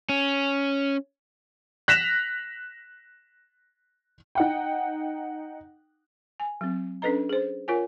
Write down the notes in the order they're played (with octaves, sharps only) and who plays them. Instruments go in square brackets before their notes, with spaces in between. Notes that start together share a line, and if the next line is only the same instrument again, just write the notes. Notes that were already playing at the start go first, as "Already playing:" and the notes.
[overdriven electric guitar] C#4
[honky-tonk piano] F#6 A#6 B6 E7 F7
D#4 F#5 G5
[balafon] G#5
F#3 C4
C#4 D4 A4 B4 D#5 A#5
G#4 C5
F4 A#4 C#5 F#5 G#5